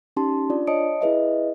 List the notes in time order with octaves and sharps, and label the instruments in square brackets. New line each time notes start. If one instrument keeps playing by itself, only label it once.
[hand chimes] C#4 D#4 G4 A5 C6
D4 F4 D5
C#5 D#5 A5 D#6 C#7 D7
E4 G#4 B4 D#5 E5